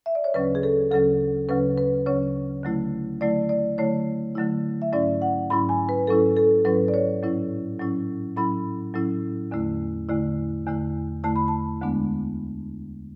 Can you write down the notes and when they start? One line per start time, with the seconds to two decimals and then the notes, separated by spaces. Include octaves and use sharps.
0.06 E5
0.15 D5
0.24 C#5
0.34 D2 C#3 F#3 C#4 B4
0.55 G#4
0.63 A4
0.91 D2 C#3 F#3 C#4 A4
1.49 D2 C#3 F#3 C#4 B4
1.78 B4
2.06 D2 C#3 F#3 C#4 C#5
2.63 D3 F#3 A3 E4
3.21 D3 F#3 A3 E4 D5
3.49 D5
3.78 D3 F#3 A3 E4 C#5
4.35 D3 F#3 A3 E4
4.82 E5
4.93 G#2 F#3 C#4 E4 D5
5.22 F#5
5.50 G#2 F#3 C#4 E4 B5
5.69 G#5
5.89 B4
6.07 G#2 F#3 C#4 E4 A4
6.37 A4
6.65 G#2 F#3 C#4 E4 B4
6.88 D5
6.94 C#5
7.23 A2 F#3 C#4 E4
7.80 A2 F#3 C#4 E4
8.37 A2 F#3 C#4 E4 B5
8.94 A2 F#3 C#4 E4
9.51 E2 D3 A3 E4
10.09 E2 D3 A3 E4
10.66 E2 D3 A3 E4
11.24 E2 D3 A3 E4 A5
11.36 B5
11.48 A5
11.81 D2 D3 G#3 B3 D4